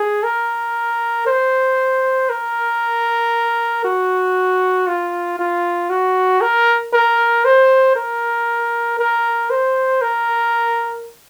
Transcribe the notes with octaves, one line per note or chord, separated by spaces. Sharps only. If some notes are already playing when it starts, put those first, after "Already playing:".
Already playing: G#4
A#4
C5
A#4
F#4
F4
F4
F#4
A#4
A#4
C5
A#4
A#4
C5
A#4